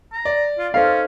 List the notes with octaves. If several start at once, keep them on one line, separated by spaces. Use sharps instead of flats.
A#5
D5
F4
C#4 D#4 A4 C5 F5
C5